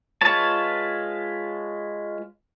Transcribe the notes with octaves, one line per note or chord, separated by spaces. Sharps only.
G#3 F4 B4 C#5 A5